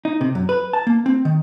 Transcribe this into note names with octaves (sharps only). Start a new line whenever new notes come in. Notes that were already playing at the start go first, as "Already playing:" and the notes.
D#4
C3
F#2
B4
A5
A#3
C4
D#3